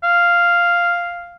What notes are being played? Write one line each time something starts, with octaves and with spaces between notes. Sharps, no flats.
F5